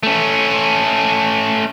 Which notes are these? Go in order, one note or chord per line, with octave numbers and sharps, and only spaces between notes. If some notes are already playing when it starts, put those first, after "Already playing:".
A3 C#4